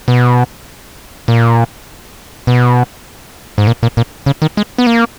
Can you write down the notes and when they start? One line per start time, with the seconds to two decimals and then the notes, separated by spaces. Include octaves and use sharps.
0.08 B2
1.28 A#2
2.47 B2
3.58 G#2
3.67 A#2
3.83 A#2
3.97 A#2
4.26 C#3
4.42 D#3
4.57 G#3
4.78 B3
4.86 A#3